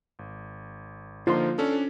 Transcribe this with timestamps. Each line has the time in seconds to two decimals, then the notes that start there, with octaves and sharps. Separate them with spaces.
0.19 G#1
1.27 D3 F3 A#3 D#4 F4 C6
1.58 C#4 D4 A4